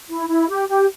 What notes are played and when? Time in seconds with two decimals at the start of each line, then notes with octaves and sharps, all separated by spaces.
0.09 E4
0.29 E4
0.49 G4
0.69 G4